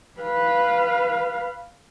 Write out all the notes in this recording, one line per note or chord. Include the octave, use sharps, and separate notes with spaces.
B4 F5